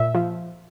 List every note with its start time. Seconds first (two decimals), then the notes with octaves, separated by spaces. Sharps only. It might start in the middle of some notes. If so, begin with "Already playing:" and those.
Already playing: A#2 E5
0.15 F3